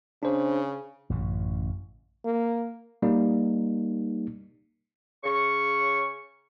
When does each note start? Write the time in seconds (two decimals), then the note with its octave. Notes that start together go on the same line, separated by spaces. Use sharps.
0.23 C#3 D4 C5
1.10 A1 F#2 C#3
2.25 A#3
3.02 G3 A#3 D#4
5.24 C#3 C#6